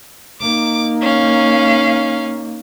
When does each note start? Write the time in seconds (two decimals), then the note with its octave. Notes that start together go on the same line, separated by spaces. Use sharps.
0.41 A#3 D#4 D6
1.01 C#4 F5